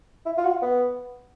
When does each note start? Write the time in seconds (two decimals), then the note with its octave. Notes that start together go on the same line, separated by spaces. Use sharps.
0.26 E4
0.37 F4
0.45 F#4
0.50 F4
0.62 B3